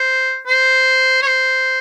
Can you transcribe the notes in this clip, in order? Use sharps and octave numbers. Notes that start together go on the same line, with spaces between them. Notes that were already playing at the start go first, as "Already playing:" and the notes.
Already playing: C5
C5
C#5
C5